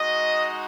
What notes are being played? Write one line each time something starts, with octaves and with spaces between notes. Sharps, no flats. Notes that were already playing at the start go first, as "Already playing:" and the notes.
Already playing: G#3 D#4 F#4 D#5